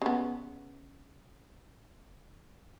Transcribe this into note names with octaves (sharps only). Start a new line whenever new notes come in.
C#3 B3